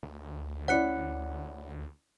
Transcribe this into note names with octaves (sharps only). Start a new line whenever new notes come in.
D2
C#4 E4 D5 F#5 F#6 C#7